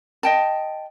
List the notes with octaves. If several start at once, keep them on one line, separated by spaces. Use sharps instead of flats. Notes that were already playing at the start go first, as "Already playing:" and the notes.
D#5 G5 A5